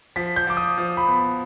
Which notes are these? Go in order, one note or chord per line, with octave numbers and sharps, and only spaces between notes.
F3 B6
G6
F3 D6
D#6
F3
B5
B3